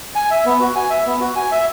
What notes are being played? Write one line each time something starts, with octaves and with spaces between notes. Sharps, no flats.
G#5
E5
B3
F#4
G#5
E5
B3
F#4
G#5
E5